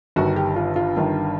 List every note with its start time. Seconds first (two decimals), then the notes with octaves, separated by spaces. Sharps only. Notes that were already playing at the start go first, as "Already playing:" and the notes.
0.16 G1 G2 D#3 F#4
0.36 G4
0.56 F4
0.76 F4
0.96 G1 G2 D#3